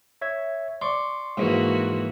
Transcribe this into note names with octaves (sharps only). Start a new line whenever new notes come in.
C#5 E5 G#6
D5 C6 C#6
G#2 E3 A#3 F#4